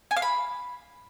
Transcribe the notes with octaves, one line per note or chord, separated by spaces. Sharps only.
G#5
F5
B5